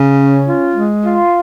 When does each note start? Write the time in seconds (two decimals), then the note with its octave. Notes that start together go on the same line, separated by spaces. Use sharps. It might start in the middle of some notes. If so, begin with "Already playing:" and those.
Already playing: C#3
0.16 C#4
0.46 F4
0.75 G#3
1.05 F4